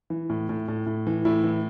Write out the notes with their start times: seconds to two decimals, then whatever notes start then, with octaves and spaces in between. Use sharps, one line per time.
0.10 E3
0.30 A2
0.49 A2
0.68 A2
0.86 A2
1.07 E3
1.25 A2 E4
1.44 E3